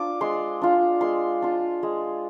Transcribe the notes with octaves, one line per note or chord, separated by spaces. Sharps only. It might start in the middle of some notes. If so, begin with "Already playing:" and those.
Already playing: D4 F4 D6
G#3 C6
D4 F4
G#3 C6
D4 F4
G#3